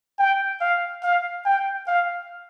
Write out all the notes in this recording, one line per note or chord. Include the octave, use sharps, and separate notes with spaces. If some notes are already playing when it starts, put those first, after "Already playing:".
G5
F5
F5
G5
F5